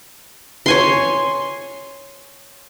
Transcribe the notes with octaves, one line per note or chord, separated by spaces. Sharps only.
C#5 G#5 C6